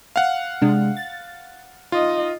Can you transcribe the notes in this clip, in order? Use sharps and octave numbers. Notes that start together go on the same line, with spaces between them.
F5 F#5
C3 G#3 D4
A6
D#4 F4 D#5